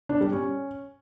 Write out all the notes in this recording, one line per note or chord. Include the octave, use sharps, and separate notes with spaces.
D4
G3
C#4